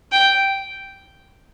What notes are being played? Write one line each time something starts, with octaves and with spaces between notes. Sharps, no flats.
G5